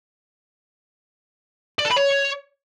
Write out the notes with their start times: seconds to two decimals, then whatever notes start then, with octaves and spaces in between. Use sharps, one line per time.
1.79 D5
1.85 A4
1.91 B5
1.97 C#5